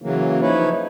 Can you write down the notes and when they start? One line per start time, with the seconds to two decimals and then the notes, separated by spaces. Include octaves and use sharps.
0.02 C#3 E3 F#3 A#3
0.42 F3 D#4 E4 B4 C#5